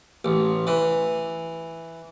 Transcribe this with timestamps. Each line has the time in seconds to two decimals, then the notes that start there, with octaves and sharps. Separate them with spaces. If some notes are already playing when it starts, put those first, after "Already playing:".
0.25 A1
0.67 E3